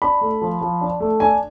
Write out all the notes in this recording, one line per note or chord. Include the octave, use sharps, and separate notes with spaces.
D4 B5
A3
F3
F3
D4
A3
D4 G#5